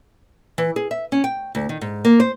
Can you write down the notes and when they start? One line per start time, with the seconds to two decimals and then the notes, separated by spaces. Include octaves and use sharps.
0.58 E3
0.76 G#4
0.91 E5
1.12 C#4
1.24 G5
1.55 D2
1.69 D#3
1.81 G#2
2.05 A#3
2.20 C5